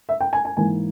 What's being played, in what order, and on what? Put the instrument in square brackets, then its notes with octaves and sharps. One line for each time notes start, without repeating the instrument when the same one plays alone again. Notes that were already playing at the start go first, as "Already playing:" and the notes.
[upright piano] E5
G5
G#5
G#5
G#2 E3 A#3 G#5